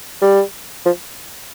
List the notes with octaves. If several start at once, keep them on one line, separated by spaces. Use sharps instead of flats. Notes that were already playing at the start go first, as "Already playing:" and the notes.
G3
F3